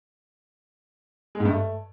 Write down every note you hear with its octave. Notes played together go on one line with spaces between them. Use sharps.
G#3
G#2
G2
A3